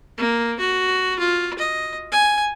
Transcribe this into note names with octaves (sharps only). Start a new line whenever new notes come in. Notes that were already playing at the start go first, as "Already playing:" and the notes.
A#3
F#4
F4
D#5
G#5